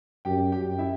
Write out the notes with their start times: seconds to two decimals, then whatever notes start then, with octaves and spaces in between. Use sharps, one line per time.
0.25 F#2 G4 G5
0.52 G4 G5
0.66 F#2
0.79 E4 E5